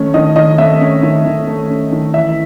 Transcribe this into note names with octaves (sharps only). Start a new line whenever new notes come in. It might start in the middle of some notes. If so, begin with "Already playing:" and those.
Already playing: D#3 A3 C#4
D#3 D#5
D#3 D#5
A3 E5
C#4
D#3
D#3
A3
C#4
D#3
E3 E5